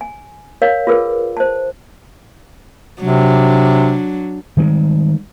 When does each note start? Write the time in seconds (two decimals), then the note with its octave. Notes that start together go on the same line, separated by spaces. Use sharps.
0.01 G#5
0.62 A#4 C#5 F5
0.87 F4 G#4 A#4 B4
1.37 C5 A5
3.00 C3 F#3 D4
4.57 D#3 F3 G3 G#3